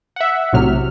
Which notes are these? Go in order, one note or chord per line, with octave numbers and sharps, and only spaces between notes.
E5 F#5
B1 A2 C3 F#3 F6